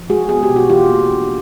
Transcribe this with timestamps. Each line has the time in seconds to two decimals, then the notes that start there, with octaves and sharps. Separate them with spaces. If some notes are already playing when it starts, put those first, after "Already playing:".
Already playing: F3
0.10 G#3 F#4 G#4
0.29 B3 G#4
0.43 G4
0.50 B2
0.56 F#4
0.69 E3 F4 G4
0.89 A#3
1.10 D4